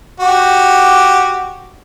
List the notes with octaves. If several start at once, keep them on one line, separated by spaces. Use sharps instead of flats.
F#4 G4